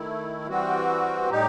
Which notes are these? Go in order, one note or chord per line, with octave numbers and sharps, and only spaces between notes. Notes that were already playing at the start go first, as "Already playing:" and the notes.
Already playing: D#3 A3 E4
E3 G3 C4 F#4
A2 G3 D#4 G4